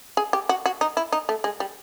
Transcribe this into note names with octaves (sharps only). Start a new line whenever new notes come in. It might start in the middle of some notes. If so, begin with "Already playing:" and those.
G#4
G4
F#4
F#4
D#4
E4
D#4
A3
G#3
G3